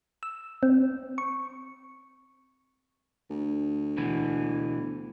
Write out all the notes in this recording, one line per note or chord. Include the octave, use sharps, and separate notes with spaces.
E6
C4
C#6
D2
B2 E3